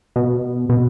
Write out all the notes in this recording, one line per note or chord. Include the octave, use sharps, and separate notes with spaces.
B2
B2